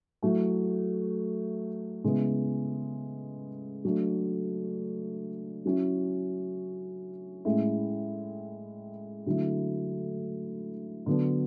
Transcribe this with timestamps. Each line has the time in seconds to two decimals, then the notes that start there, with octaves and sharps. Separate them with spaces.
0.22 F#3 A3 E4
2.04 C#3 G#3 B3 E4
3.85 F#3 A3 D4
5.65 F#3 C#4 E4
7.45 A2 G#3 C#4 E4
9.26 D3 F#3 A3 E4
11.06 D3 F#3 B3 D4